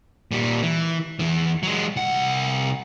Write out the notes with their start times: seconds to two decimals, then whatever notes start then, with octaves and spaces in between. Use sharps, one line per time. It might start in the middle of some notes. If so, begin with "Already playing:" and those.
0.31 A#2 G3
0.63 E3
1.19 E2 E3
1.63 F#3 G#3
1.96 C2 F#5